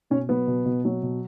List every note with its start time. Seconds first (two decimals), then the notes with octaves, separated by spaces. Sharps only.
0.10 B2 C#4
0.29 F#3 B3
0.47 B2
0.65 B2
0.85 F#3
1.03 B2